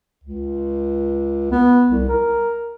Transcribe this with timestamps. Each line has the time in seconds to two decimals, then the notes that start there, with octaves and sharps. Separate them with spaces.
0.24 C#2
1.52 B3
1.90 C2
2.09 A#4